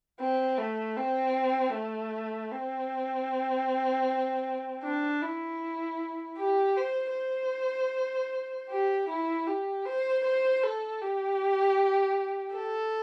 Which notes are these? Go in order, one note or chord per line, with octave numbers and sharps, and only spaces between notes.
C4
A3
C4
A3
C4
D4
E4
G4
C5
C5
G4
E4
G4
C5
C5
A4
G4
A4